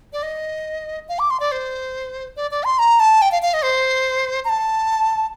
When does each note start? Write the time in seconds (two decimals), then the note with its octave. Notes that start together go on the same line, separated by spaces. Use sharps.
0.13 D5
0.23 D#5
1.09 F5
1.19 D6
1.30 C6
1.40 D5
1.52 C5
2.36 D5
2.51 D5
2.64 C6
2.79 A#5
3.00 A5
3.22 G5
3.32 F5
3.42 F5
3.54 D#5
3.63 C5
4.45 A#5
4.49 A5